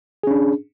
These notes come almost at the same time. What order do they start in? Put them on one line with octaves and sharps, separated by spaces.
G#4 C#4 D4